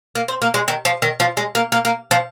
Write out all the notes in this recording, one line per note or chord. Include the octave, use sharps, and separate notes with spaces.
A#3
C4
A#3
G#3
D#3
F3
D#3
F3
G#3
A#3
A#3
A#3
F3